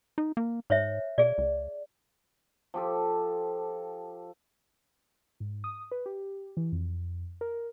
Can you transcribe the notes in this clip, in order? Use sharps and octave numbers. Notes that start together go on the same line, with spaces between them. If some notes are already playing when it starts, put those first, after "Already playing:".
D#4
A#3
G#2 C5 C#5 E5
B2 G#4 D5
C#2
F3 G4 A4
G#2
D#6
B4
G4
E3
F2
A#4